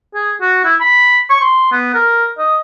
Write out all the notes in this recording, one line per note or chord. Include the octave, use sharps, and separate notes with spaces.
G#4
F#4
E4
B5
C#6
C6
B3
A#4
D#5